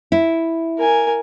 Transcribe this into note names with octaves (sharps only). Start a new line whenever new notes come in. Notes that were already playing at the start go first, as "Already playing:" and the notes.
E4
A#4 G#5